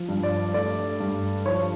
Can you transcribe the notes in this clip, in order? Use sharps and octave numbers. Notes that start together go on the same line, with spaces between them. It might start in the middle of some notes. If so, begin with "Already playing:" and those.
Already playing: F3
G2
D5
A3 D5
G2
F3 C#5